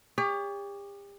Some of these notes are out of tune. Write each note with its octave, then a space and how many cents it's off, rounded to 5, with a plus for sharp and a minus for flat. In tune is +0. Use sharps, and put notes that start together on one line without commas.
G4 +40 C#5 +40